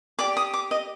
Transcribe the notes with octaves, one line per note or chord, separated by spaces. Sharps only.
G4 D5 D6
D#6
D6
D#5